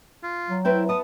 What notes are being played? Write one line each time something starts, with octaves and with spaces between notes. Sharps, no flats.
F4
F#3
C4 E4 B4 G5
B3 A5 D#6